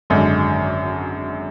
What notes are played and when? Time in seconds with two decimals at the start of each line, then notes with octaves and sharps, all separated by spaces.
0.10 G#1 F#2 D3 G#3